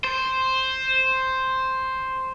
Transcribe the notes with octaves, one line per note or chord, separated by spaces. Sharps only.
C5